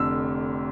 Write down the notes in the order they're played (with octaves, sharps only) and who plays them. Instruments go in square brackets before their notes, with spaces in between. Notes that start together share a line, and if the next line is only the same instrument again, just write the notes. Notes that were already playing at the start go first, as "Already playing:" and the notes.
Already playing: [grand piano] F1 F2 D3 E6